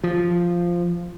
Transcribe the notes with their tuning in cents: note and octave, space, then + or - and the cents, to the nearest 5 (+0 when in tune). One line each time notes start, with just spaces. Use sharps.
F3 -5